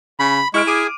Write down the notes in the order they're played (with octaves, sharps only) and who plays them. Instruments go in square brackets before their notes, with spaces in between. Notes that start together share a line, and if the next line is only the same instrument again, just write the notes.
[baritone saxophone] C#3 [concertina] B5
[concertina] G#3 [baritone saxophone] E4 [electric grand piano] C#6 F6 D7
[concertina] G#4 G#5 [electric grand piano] D6 D7 D#7